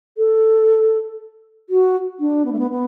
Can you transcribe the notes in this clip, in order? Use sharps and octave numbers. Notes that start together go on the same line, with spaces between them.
A4
F#4
D4
B3
A3
B3
B3